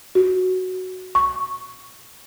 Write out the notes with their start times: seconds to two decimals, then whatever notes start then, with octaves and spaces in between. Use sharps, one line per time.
0.15 F#4
1.15 C#6